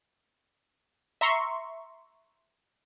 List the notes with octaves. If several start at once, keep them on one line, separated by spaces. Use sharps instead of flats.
E5 A#5 C6 C#6